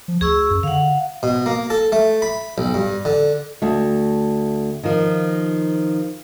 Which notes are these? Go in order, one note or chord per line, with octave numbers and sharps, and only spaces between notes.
F3
D2 G#4 C#6 E6
F#2
D3 F5 F#5
B2
A#3
A4
A3
B5
B1
G2
D3
D2 A3
D#3 F3